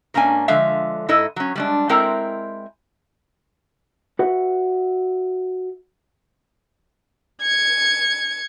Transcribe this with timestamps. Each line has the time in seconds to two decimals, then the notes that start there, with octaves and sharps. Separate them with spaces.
0.14 G#2 A#3 C#4 D4 G#5
0.48 D3 F3 G#3 E5 F5
1.09 G#2 E4 A4 D#5
1.36 F#3 C#4
1.56 G3 G#3 D4
1.89 G#3 C4 E4 A#4 G5 A#5
4.19 F#4 B4 E5 F#5
7.42 G#6 C#7